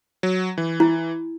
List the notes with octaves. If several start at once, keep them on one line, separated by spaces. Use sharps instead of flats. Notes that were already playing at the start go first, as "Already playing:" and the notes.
F#3
E3
E4